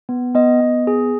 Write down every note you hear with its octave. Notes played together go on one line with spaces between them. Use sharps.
B3
B3 D#5
B3
G#4